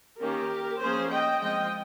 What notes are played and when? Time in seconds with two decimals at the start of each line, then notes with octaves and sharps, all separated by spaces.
0.20 D#3 A#3 C#4 G4 A#4
0.80 F3 A#3 C#4 G#4 C5
1.11 D#5 G5
1.41 F3 G#3 C4 D#5 G5